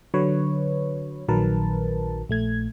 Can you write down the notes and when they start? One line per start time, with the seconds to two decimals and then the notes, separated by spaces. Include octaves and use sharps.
0.14 D3 F#3 B4 C#5
1.28 A#1 D#3 F#3 A#4 B4 A5
2.29 A#1 A3 G#6